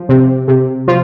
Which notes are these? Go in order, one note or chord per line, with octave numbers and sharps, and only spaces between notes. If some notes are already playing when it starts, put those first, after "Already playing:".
Already playing: F3
C3
C3
F3 F4